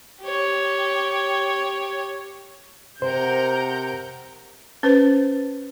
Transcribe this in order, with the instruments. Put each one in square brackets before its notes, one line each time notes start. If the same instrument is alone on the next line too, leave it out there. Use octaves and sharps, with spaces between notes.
[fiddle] G4 C#5
[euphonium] C3 [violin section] A#4 F#5 G6 [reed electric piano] C5
[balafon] C#4 B4 C5